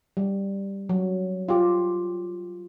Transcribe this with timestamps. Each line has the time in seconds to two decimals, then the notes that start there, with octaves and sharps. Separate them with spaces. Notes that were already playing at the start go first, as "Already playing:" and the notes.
0.17 G3
0.89 F#3
1.49 F4 G4